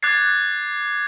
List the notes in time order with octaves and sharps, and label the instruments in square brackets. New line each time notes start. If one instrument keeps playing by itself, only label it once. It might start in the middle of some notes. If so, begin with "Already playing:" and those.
[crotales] D6 F#6 G#6 A6 C7